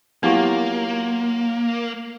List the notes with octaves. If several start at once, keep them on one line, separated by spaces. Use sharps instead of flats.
F#3 A#3 B3 E4 F4 G4